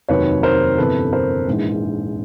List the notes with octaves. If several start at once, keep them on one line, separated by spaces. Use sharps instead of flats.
F1 D#2 D#3 F#3 B4 C#5
A#4 C5
G1 F2 C3 E3 A4 B4
A#4 C5
A#1 G#2 E3 G#3